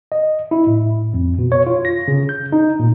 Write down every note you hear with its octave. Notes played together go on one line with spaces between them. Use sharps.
D#5
E4
A2
F2
B2
C#5
F4
A#6
C#3
G6
D#4
A#2